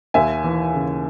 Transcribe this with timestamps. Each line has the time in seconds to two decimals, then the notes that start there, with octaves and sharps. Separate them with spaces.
0.14 D#2 E5 G#5
0.44 E3
0.74 C#3